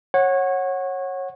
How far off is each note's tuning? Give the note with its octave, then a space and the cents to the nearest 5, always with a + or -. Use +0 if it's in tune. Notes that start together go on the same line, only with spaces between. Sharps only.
C#5 -20 F#5 -5